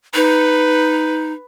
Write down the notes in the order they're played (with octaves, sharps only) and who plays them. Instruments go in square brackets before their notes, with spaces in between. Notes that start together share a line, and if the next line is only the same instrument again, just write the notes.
[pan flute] D#4 [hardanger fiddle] B4